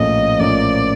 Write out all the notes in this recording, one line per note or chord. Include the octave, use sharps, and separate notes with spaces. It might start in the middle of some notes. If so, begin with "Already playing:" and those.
Already playing: A#1 A2 F3 A#3 C#4 D#5
A#1 A2 F3 A#3 C#4 D5